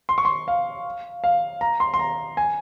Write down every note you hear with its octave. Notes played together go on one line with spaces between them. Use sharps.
C6
C#6
C6
F5
F5
A#5
C6
C6
A#5
G#5